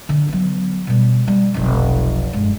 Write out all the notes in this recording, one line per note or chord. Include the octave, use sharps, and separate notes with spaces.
D3
F#3 B3
B2 G3
G3
F1 B1
G2 G#3